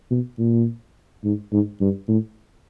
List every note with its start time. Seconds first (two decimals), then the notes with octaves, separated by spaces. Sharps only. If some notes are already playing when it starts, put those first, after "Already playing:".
0.10 B2
0.38 A#2
1.24 G#2
1.52 G#2
1.81 G2
2.08 A2